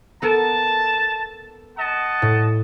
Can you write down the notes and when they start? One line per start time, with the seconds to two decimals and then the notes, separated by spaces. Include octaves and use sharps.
0.22 B3 A4 A#4 A5
1.77 D#5 F#5 A5
2.22 A2